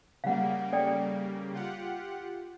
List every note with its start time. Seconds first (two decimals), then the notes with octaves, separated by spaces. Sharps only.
0.24 C#3 G3 A#3 F5 F#5
0.73 A4 D5 G5
1.54 F4 G4 F#5